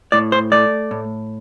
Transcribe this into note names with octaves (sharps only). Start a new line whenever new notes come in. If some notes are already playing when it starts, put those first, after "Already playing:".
A2 D5
C5
A3 D5
A2